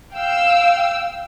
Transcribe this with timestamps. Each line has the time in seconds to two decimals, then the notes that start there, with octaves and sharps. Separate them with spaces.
0.14 F5 G5 E6